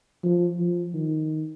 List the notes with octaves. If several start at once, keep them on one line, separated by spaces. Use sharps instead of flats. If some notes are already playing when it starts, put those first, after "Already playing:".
F3
F3
D#3